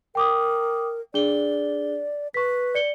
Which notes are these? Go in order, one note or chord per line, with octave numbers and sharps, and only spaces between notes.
A#4 G5 D6 D#6
D4 G#4 D5 G7
B4 C#6 B6
D5 C#7 G7